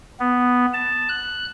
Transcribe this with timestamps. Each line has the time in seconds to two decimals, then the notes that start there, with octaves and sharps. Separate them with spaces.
0.20 B3
0.74 A5
1.09 F#6